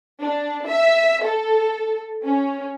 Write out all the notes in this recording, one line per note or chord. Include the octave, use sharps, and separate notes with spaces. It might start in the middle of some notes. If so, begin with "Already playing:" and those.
D4
E5
A4
C#4